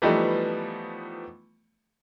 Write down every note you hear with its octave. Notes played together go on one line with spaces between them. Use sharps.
E3 F3 G3 A3 B3 D#4